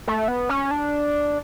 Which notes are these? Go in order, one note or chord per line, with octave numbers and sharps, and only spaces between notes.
A3
B3
C#4
D4